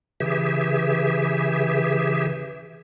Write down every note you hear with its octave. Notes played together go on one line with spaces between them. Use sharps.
C#3 E3 G4 G#4 E5